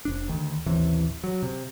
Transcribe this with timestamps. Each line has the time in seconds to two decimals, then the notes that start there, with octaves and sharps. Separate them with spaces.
0.05 F1 D4
0.28 D2 D#3
0.66 A1 D#2 C3 E3
1.24 F#3
1.43 C3